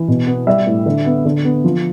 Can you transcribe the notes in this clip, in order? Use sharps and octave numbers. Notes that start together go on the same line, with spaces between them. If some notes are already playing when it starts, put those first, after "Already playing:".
Already playing: E3
B2
B3
G3 E5
A2
D3
B3
D3
B3
F3